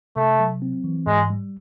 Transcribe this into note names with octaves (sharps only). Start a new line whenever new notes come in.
C3 A3
F#3
C4
E3
G#2 G#3
G3